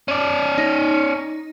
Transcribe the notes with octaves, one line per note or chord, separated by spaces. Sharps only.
C#4 D5
D#4